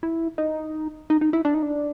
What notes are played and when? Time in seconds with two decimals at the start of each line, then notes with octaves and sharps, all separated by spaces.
0.03 E4
0.38 D#4
1.10 D#4
1.21 D#4
1.33 E4
1.45 D4
1.54 D#4
1.62 D4